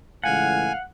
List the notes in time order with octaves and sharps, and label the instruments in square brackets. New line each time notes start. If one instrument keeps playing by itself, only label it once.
[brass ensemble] C#2 A2 E3 [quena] F5 [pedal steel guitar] F#5 [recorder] G#5